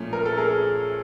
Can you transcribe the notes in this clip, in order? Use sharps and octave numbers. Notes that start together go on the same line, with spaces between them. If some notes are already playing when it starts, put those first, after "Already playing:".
Already playing: A#2 F3 A3 C#4
A#4
A4
G#4 A#4